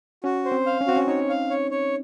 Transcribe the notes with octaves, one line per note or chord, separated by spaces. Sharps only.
C#4 F#4
C5
C4
F5
C#4
C4 F#4
C#4
D#4 C#5
F5
C#5
C#5